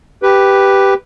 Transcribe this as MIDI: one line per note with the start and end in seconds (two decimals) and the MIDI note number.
0.23 0.94 67
0.23 0.94 71